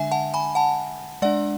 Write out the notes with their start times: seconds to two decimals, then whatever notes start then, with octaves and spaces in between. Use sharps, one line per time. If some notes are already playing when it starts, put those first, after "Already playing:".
Already playing: D3 G#3 D4 E5 G#5
0.11 F#5 A5
0.34 G#5 B5
0.55 F#5 A5
1.22 G#3 D4 D5 F#5